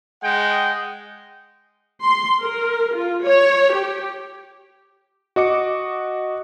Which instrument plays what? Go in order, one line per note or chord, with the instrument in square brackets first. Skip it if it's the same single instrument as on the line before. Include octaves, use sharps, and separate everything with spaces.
[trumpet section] G#3 D#5 F#5 G5
[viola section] C6
A#4
F4
C#5
G4
[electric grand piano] F#4 D#5 D6 C#7